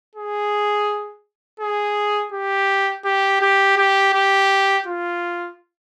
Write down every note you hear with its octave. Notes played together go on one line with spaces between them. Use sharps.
G#4
G#4
G4
G4
G4
G4
G4
F4